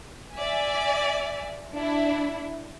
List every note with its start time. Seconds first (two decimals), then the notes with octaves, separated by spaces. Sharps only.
0.35 D5 E5 G#5
1.74 D4 E4